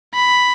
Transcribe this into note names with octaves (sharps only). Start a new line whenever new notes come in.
B5